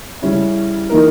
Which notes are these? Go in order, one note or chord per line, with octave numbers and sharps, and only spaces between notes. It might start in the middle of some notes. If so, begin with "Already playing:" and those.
C#3 G3 C#4 E4
E3 A#3 D#4 A#4